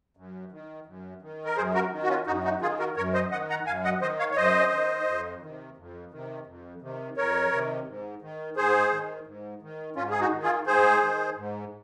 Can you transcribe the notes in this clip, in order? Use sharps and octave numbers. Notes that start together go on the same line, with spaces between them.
F#2
D#3
F#2
D#3
A#4
F#2 G#4 C5
F#4 A#4
D#3
F#4
C#4 F4
F#2 D#4 F#4
D#4 F#4
D#3 F4 G#4
F#4 A#4
F#2 A#4 C#5
C5 D#5
D#3 D#5 F#5
F#5 A#5
F#2 F5 G#5
D#5 F#5
D#3 C5 D#5
C#5 F5
C#5
F#2 C5 D#5
D#3
F2
C3 D#3
F2
C3 D#3
F2
C3 D#3
F2 A#4 C#5
C3 D#3
G#2
D#3
G#2 G#4 C5
D#3
G#2
D#3
G#2 C#4 F4
G#4
D#4 F#4
D#3
F4 G#4
G#2 G#4 C5
D#3
G#2